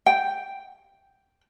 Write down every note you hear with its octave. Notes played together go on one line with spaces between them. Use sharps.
G5